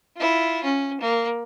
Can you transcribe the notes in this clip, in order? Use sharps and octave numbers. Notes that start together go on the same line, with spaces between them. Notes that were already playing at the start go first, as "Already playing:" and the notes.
E4 F4
C#4
A#3